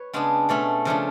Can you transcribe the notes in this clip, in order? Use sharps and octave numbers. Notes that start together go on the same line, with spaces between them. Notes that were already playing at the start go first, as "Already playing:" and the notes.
Already playing: B4 C#5
C#3 G#3 B3 D4
B2 A3 C#4 D5
C#3 F3 A3 D4